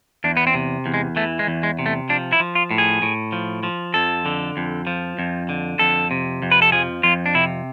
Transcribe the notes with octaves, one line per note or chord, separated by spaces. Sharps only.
E2 D4
B3
C4
C3
E2
G#3
E3 A3
G#3
E2
G#3
C3
A3
F3 D4
E4
F3
F4
A2
G#4
A2
F3
F3
F2 A4
D3
F2
F3
F2
D3
F2 A4
C3
F2
B4
A4
F3 G#4
F2 F4
D4
C3 E4